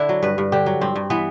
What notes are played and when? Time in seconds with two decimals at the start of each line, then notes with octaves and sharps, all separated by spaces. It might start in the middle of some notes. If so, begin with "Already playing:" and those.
Already playing: D3 D4 E4
0.09 F#3
0.23 G2 B4
0.38 G2
0.52 D3 G4
0.66 F#3
0.81 G2 C4
0.96 G2
1.10 E3 B3